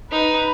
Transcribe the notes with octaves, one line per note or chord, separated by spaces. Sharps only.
D#4 B4